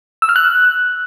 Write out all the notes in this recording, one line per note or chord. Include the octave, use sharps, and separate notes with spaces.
E6
F6
F#6